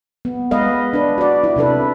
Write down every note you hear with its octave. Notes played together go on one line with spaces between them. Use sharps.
B3
G#3 B3 B4 D#5 F5
D4 B4
F#4 D5
E4
C3 D4 A4 B4